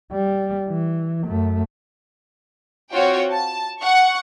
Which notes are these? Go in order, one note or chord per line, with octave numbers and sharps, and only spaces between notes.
G3
E3
F#2 A3
C4 F4 F#4 C#5 G5
A5
F#5 C#6